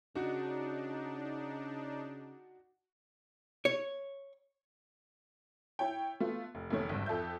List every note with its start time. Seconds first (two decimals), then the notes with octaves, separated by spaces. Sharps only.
0.15 C#3 D4 D#4 F#4
3.65 C#5
5.79 E4 C#5 G5
6.20 A3 B3 F4
6.55 F1
6.70 F1 D#3 A3 C#5
6.89 G#1 D2 G2
7.06 F2 A4 E5 G6